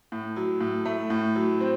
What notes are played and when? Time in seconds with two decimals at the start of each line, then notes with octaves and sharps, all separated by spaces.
0.12 A2
0.36 F#3
0.61 A2
0.85 A3
1.10 A2
1.35 F#3
1.60 C4